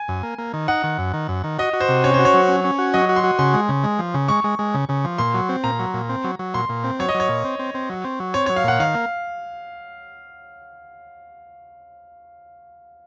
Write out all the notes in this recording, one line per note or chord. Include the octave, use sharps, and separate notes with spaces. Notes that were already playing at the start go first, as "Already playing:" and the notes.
Already playing: G#5
F#2
A#3
A#3
D#3
D#4 F#5
D#3
F#2
D#3
F#2
D#3
F#4 D#5
F#4
C5
C3
C#4 C#5
F#4 C5
C#5
F#3
C#4
C#4
F#4
F#3 D#5
F#4
C6
F#4
C#3 C6
G#3
C#3
G#3
F3
C#3
G#3 C#6
G#3
G#3
C#3
C#3
F3
A#2 C6
F#3
C4
A#2 A#5
F#3
A#2
C4
F#3
F#3
A#2 C6
A#2
C4
F#3 C#5
D#5
F#3
C#5
A#2
C4
C4
C4
F#3
C4
F#3
C4 C#5
C#5
F#3
F5
A#2 F#5
D#3 F5
A#3